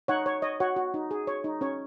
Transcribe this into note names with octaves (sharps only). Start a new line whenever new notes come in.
D#4 C#5 F#5
C#5
C#5 D#5
F#4 C#5 F#5
F#4
D#4
G#4
C#5
D#4
C#4 C#5